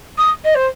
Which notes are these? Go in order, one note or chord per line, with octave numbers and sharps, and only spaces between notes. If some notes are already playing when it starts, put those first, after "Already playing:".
D#6
D#5
C5